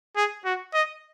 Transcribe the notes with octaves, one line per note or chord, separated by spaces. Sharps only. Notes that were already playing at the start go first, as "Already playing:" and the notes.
G#4
F#4
D#5